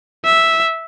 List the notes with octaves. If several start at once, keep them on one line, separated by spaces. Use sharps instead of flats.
E5